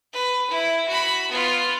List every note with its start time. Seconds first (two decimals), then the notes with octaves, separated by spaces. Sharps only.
0.13 B4
0.50 E4
0.88 F#4 B5
1.31 B3 F4